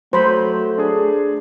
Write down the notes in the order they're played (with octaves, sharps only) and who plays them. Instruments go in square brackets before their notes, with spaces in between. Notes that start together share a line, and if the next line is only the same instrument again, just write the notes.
[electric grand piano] F#3 [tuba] A3 [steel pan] C5 B5
[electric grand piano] D4 G#4